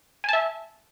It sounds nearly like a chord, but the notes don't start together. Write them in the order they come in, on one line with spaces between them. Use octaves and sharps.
G#5 A5 E5